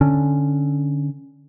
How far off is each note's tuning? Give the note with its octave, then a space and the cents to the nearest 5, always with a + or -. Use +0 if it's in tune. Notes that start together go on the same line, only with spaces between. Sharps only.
D3 +0 C#4 +0